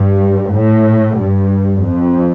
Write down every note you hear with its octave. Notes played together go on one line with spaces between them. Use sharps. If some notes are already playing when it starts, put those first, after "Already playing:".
Already playing: G2
A2
G2
F2